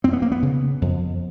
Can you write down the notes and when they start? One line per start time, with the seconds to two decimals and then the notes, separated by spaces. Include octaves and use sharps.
0.04 F2 C4
0.13 B3
0.22 A#3
0.32 B3
0.42 C#3
0.82 F2